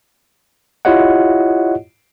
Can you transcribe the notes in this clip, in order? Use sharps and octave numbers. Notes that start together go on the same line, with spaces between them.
E4 F4 G4 C#5 D#5 F#5